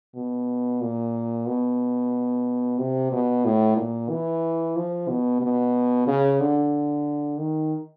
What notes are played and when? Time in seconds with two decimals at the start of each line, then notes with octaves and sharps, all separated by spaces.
0.16 B2
0.81 A#2
1.47 B2
2.79 C3
3.12 B2
3.45 A2
3.77 A#2
4.10 E3
4.77 F3
5.09 B2
5.41 B2
6.07 C#3
6.40 D3
7.39 D#3